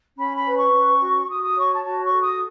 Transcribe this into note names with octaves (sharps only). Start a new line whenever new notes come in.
C#4 B5
B5
B4
C#6
C#4
F#4
F#4 D#6
D#6
C#5 C#6
A5
F#4 A5
C#6
A4
D#6